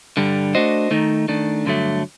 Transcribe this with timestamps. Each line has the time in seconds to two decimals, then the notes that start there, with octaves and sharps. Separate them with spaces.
0.17 G2 D3 G3
0.55 A3 D4 F#4 C5 D#5
0.91 D#3 A3 D#4
1.28 D#3 A3 D4
1.65 G2 D3 F#3 A3